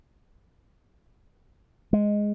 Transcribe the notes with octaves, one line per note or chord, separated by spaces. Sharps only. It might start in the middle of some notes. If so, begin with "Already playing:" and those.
G#3